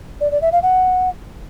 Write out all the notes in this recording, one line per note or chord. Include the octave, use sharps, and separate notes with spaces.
D5
D5
E5
F5
F#5